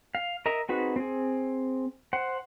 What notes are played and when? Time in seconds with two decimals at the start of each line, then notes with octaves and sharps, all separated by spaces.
0.15 F5
0.46 A#4 D#5 E5 A#5
0.69 C4 D#4 F#4 G#4 B4
0.96 C4 G#4
2.13 C5 F#5